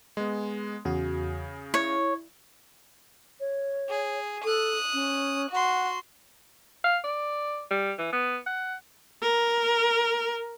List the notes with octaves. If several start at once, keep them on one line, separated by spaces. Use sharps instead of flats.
G#3 B3
E2 C#3 F#4 G#4
E4 C#5
C#5
G#4
A4 D#6 F#6
C#4
F#4 F#5 C6
F5
D5
G3
E3
B3
F#5
A#4